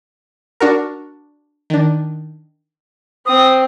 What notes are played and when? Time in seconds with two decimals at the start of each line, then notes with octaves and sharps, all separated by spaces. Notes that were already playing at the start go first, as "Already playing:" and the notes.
0.60 D4 F#4 A#4
1.70 D#3 D4
3.26 C4 D#6